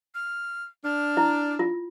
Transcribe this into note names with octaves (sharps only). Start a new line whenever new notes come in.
F6
D4 F6
E4
F4